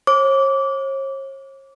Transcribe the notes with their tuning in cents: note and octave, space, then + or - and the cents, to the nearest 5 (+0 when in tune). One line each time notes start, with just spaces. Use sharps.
C#5 -45 D6 -20